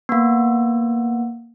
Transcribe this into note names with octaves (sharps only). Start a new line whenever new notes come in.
A#3 B3